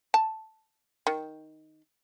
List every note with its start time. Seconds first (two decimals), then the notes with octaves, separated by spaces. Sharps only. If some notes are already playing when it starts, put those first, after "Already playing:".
0.14 A5
1.07 D#3